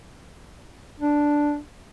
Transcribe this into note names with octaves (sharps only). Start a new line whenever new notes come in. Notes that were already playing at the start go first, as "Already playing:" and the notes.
D4